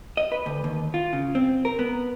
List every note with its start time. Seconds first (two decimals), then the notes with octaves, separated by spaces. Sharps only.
0.17 D#5
0.32 B4
0.46 D2
0.64 D#2
0.94 F4
1.13 C#3
1.35 C4
1.65 A#4
1.79 B3